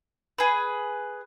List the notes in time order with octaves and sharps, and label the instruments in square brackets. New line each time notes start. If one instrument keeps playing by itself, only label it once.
[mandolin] G#4 B4